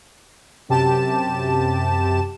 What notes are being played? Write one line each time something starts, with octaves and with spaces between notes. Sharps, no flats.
F#2 C3 G4 A5 E7